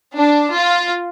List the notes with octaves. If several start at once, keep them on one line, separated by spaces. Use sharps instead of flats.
D4
F4